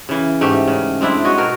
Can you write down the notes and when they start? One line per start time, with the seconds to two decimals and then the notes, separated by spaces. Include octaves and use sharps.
0.09 C#3 E3
0.41 G#2 A3 G4
0.68 C#3
1.01 G#3 C4 D4 E4
1.25 F#4 C#5 D#5
1.38 B2 A3 A#4